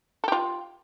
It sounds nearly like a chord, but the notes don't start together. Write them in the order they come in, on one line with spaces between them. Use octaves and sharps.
A4 G4 F4